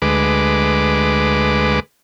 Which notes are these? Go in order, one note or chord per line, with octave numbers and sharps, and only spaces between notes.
D2 G#3 B4 D6